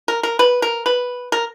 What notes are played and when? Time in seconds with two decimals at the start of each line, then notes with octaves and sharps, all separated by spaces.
0.08 A#4
0.23 A#4
0.39 B4
0.62 A#4
0.86 B4
1.32 A#4